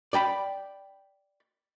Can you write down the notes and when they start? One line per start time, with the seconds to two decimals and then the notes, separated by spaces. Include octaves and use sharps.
0.13 D5 G5 A#5 B5